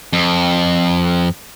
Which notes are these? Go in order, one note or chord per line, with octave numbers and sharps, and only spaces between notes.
F2